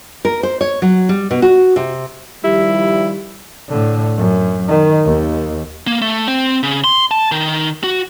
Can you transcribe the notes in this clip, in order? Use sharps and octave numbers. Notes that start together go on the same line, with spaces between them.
A#4
C5
C#5
F#3
G3
B2
F#4
C3
D#3 F3 G3 E4 G4
A2 D3
F#2
D#3
D#2
A#3
A3
C4
C#3
C6
A5
D#3
F#4